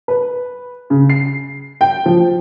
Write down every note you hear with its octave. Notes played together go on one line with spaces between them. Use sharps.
B4
C#3
C7
G5
F3